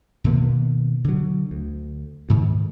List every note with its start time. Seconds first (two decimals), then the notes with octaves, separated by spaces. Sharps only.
0.24 B2 D#3 A#3 B3
1.04 D3 F#3
1.51 D2
2.29 D2 G#2 D#3